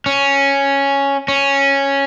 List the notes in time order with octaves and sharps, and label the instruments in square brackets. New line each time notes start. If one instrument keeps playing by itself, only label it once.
[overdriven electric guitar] C#4
C#4